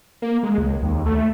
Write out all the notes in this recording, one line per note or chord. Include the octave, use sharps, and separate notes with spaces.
A#3
G#3
C#2
D#2
A3